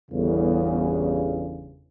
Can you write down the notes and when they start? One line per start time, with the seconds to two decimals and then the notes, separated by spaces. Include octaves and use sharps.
0.11 G1 E2 C#3